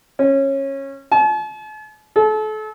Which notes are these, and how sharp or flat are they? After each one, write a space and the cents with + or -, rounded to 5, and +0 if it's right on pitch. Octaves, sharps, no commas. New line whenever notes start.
C#4 -20
A5 -45
A4 -35